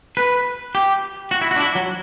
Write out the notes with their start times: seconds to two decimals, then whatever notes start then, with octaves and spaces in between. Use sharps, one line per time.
0.17 B4
0.75 G4
1.31 F#4
1.41 E4
1.51 F#4
1.56 D4
1.60 E4
1.75 F#3